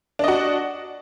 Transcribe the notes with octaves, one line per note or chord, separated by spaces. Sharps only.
D4 F#4 D#5